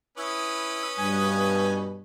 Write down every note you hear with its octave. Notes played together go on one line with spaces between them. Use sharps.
C#4 E4 B4 D#6
G2 B2 G#5